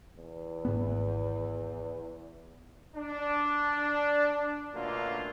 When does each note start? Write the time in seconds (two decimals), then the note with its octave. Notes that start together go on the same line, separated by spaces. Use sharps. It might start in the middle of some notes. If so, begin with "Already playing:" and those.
0.16 E2
0.65 G#1 G#2 B3
2.96 D4
4.74 F#2 B2 A3 A#3 D4 F4